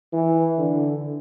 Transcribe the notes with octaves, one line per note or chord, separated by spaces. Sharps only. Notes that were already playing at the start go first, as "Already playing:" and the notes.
E3
D3